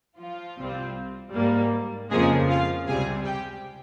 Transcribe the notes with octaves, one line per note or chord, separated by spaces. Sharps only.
F3 F4
C2 C3 G3 C4
G#2 G3 A#3
F2 C#3 F3 G#3 A#3 G#4
F4 F5
C#2 C3 G3 C4 G#4 G#5
G4 G5